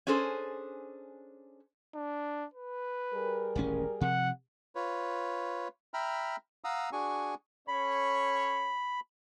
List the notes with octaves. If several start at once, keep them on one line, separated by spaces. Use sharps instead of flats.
C#4 D4 G#4 A4 C5
D4
B4
G3 G#4 A#4
D#1 A1 C#4
C3 F3 F#5
F4 B4 C#5
E5 G5 A#5 B5 F6
F5 F#5 A#5 D#6 E6
D4 F#4 G#4 G#5 C#6
C#4 A4 C#5 B5